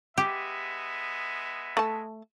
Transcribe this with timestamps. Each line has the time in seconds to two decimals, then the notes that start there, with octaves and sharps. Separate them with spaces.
0.18 G#3 B3 G4 E5
1.77 A3 A5